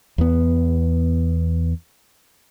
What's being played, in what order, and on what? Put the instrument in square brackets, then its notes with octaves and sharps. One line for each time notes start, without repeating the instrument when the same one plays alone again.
[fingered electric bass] E2 B3